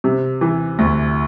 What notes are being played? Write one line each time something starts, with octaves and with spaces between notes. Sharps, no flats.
C3
E3
D2